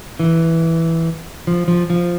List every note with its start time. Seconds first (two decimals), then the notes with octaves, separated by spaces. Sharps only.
0.20 E3
1.47 F3
1.68 F3
1.90 F3